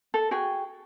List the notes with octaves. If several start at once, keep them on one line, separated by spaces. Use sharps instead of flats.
A4
F#4 G#4 G5